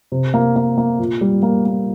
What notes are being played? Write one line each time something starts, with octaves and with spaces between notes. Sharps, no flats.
C3
A#3
A#3
A#3
A#2
G3
A#3
A#3